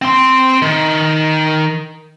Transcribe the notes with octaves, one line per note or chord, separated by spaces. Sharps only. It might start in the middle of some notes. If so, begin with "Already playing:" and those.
C4 C6
D#3